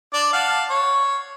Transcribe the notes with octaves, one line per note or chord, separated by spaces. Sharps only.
D4 D5
F5 F#5 A5
C#5